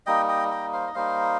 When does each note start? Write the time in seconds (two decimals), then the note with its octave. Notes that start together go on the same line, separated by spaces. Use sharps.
0.06 G3 A#3 D#4 D#5 G5
0.29 D#5 G5
0.51 D#5 G5
0.73 C5 F5
0.87 D#5
0.95 G3 A#3 D#4 C5 F5